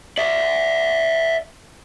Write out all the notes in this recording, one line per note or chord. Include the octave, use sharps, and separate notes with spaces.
D5 E5